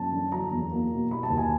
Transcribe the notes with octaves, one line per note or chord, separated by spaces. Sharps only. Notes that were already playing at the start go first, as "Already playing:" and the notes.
Already playing: F#2 A5
D3
F#3 A#5
E2
A#3
B2
G3 B5
A5
D#2
G#5